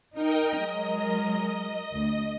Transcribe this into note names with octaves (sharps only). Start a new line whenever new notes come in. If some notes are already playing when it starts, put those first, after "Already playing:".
D#4 A#4 D#5 G5
F#3 G#3 A#4 D#5
D2